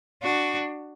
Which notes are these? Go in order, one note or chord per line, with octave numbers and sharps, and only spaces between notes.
D4 F#4